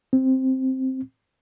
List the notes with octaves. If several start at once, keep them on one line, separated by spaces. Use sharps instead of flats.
C4